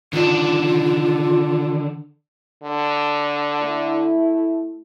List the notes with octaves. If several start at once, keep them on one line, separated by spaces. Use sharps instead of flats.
D3 D#3 D4 F4
D3
A3 E4